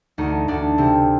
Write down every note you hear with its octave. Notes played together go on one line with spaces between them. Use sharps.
D2 D#4
D2 D4
C3 C4